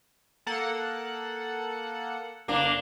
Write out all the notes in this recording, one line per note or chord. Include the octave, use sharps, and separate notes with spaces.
A#3 A4 F#5
G1 A#3 D4